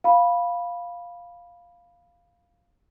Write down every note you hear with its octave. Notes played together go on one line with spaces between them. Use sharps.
F5 B5